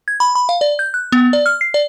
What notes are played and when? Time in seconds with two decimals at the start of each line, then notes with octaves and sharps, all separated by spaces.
0.08 G#6
0.20 B5
0.35 B5
0.49 F5
0.61 D5
0.79 G6
0.94 F#6
1.12 B3
1.33 D5
1.46 F6
1.61 C7
1.74 D5